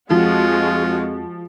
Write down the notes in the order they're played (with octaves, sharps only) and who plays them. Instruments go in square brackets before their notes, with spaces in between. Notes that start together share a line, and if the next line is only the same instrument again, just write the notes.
[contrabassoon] F2 [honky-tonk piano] F3 [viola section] G#3 F#4 [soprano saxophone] F4